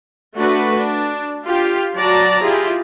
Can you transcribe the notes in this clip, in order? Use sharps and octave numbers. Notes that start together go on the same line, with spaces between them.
A3 D4 F#4 B4
D4
F4 G4 F5
F#3 F#4 D5 A5 A#5
E4 F4 G4 G#4